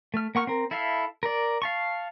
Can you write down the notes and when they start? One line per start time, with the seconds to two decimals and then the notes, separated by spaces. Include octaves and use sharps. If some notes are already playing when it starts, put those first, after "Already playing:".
0.14 A3 F6
0.35 A#3 F#5 C#6 F6
0.47 C4 A#4
0.71 E4 A4 E5 F5
1.23 A#4 D5
1.62 F5 A5 C#6